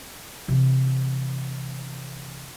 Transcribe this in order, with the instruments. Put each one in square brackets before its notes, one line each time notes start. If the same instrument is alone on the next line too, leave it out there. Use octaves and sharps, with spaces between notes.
[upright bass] C3 E3